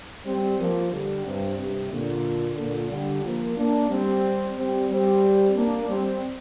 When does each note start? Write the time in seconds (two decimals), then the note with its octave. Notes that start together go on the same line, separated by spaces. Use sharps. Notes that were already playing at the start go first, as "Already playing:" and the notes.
0.25 G3 C4
0.58 F3 A#3
0.91 D3 G3
1.25 G2 C3
1.58 G2 C3
1.91 A#2 D3
2.57 A#2 D3
2.90 D3 G3
3.23 F3 A#3
3.57 A#3 D4
3.90 G3 C4
4.56 G3 C4
4.89 G3 C4
5.56 A#3 D4
5.89 G3 C4